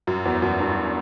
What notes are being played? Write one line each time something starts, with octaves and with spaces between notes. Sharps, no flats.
F#2
E2
F#2
G2